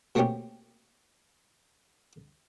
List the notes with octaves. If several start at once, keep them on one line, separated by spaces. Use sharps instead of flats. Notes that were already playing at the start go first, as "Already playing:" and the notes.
B2 A3 A#3 C4 C#4 G4